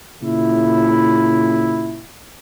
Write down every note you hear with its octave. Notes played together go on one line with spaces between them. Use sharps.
A#2 C#3 E4